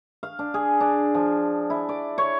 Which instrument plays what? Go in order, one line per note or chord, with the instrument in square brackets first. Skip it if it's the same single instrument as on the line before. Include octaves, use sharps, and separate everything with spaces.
[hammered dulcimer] F5
D4
G#4
D4
F3
E4
D5
C#5